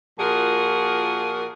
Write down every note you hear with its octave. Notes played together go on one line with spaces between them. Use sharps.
A#2 F3 F4 F#4 G#4 A#4